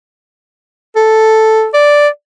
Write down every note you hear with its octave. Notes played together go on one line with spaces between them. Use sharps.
A4
D5